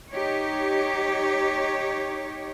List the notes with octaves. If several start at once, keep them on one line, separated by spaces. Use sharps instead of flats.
D#4 G4 C#5